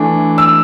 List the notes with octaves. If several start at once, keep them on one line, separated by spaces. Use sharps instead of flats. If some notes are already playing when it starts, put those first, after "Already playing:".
Already playing: E3 A3 D4
E6